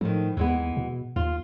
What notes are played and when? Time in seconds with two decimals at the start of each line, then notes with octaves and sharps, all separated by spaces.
0.01 A2 D#3 F3
0.37 D#2 E3 G#3 B3
0.77 B2
1.16 D#2 F4